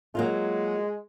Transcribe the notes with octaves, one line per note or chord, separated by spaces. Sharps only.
F#3 G#3 A#3 F4